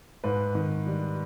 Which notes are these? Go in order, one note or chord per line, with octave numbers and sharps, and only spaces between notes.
G#2 B4
D#3
G3